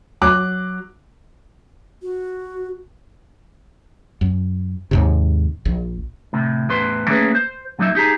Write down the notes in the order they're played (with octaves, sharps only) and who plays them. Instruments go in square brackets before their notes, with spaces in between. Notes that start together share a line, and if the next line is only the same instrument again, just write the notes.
[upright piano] F#3 D6 F#6
[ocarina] F#4
[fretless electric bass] F#2
D#2 G#2 C3
A#1
[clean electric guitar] A2 C3
E2 A2 B4 C5 C6
A3 A#3 C#4 G#4 B4
C5
A#2 F#3 A#3 D#4 D5 E5
D#4 G4 G#4 A#5